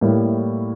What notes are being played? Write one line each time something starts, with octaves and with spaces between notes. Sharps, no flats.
A2 G3 A#3 E4